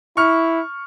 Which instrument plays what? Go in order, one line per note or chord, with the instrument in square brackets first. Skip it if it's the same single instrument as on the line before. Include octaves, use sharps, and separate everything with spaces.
[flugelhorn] E4 [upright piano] C#6 F6